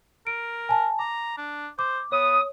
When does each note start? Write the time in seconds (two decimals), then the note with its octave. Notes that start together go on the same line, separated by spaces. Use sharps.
0.27 A#4 D7
0.69 G#5 A5
0.99 A#5 D6
1.38 D4
1.79 C5 D6
2.12 B3 C#5 D#6